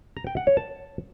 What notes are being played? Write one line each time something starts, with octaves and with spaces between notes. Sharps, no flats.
A#5
G5
F#5
C#5
A5